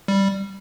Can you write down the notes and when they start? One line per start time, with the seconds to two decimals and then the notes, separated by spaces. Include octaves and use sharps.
0.08 G3